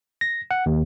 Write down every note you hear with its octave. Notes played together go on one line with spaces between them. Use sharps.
A#6
F#5
D#2